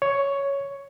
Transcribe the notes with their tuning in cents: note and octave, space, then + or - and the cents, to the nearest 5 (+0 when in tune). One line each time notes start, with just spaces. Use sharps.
C#5 +5